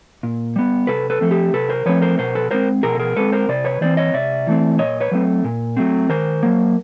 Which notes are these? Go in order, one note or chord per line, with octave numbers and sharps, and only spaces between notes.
A#2
G3 B3
C3 A4 B4
A4 B4
F3 A3 C4
G4 A4
C3 A4 B4
A#4 C5
F3 A3 C4 B4 C#5
A#4 C5
B2 A#4 C5
A4 B4
G#3 C4 A#4 C5
B2 G#4 A#4
A4
G#4 A#4
G#3 C4 A4 B4
A#4 C5
C3 C5 D5
B4 C#5
E3 A3 C4 C5 D5
C#5 D#5
C3 D5 E5
E3 A3 C4
A#2 C#5 D#5
B4 C#5
F#3 A3 C4
A#2
F#3 A3 C4
D#3 A#4 C5
F#3 A#3